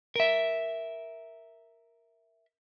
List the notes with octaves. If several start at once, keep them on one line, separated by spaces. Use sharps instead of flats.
A#4 E5